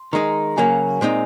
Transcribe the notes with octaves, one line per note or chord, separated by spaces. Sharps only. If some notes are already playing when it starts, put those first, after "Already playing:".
Already playing: C6
D#3 G#3 D#4 A#5
C#3 F#3 A#3 G#5
A#2 G#3 C4 D#4